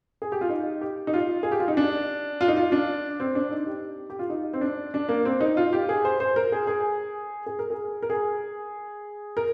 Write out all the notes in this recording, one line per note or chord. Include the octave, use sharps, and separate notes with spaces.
G#4
G4
F4
D#4
G4
D#4
F4
G#4
G4
F4
D#4
D4
F4
D#4
F4
D4
C4
D4
D#4
G4
G4
F4
D#4
C4
D4
D4
A#3
C4
D#4
F4
G4
G#4
C5
C5
A#4
G#4
G#4
G#4
A#4
G#4
A#4
G#4
A#4